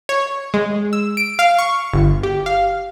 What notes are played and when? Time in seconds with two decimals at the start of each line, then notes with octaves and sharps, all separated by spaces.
0.09 C#5
0.54 G#3
0.93 E6
1.17 D7
1.39 F5
1.59 C#6
1.94 G1
2.23 G4
2.46 F5